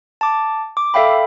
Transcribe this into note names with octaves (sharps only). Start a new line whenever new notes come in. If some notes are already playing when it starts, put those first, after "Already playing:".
A5 D6
D6
A4 E5 F5 G5 B5